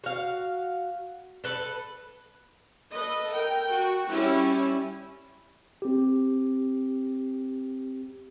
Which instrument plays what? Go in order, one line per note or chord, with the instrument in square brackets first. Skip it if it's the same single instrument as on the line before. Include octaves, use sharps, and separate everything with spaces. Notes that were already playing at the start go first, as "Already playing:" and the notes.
[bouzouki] F#4 F5
A4 B4
[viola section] A4 B4 D#5
A#4 G5
F#4
G3 C#4 E4
[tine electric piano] C4 G4